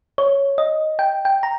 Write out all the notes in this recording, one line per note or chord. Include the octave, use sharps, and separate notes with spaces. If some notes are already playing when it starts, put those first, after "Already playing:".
C#5
D#5
G5
G5
A#5